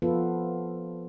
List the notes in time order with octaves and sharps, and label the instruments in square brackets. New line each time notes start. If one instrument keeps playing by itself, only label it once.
[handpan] F3 B3 F4 A4 B4